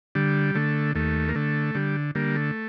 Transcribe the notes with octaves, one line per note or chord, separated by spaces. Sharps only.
D3 G3
D3 A3
D#2 A3
A#3
D3 A3
D3 G3
D3 G3 A#3
A3